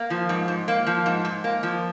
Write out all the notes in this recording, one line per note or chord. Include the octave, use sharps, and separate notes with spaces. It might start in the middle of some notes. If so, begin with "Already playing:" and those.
Already playing: A#3
F3
G#2
G#2
A#3
F3
G#2
G#2
A#3
F3